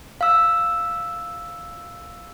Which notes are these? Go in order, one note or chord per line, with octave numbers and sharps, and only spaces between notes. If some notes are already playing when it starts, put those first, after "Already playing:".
F5 E6